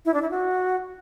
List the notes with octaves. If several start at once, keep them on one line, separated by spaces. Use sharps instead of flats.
E4
D4
E4
F#4